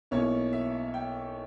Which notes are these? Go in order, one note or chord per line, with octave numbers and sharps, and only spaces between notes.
B1 B2 A#3 C#4 E4 C#5
E5
G5